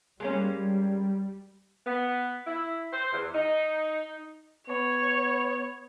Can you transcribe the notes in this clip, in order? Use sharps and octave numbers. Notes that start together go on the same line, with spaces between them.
G3 G#3 A#3 C#4
B3
E4
C5
E2
D#4
B3 C#5